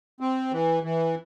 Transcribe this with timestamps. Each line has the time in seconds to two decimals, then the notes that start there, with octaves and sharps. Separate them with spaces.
0.20 C4
0.52 E3
0.83 E3